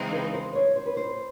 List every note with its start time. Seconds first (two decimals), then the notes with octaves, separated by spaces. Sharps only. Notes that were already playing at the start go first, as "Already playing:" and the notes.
Already playing: C#3 E3 G#3 C4 D#4
0.13 B4
0.34 C5
0.55 C#5
0.76 C5
0.86 B4
0.97 C5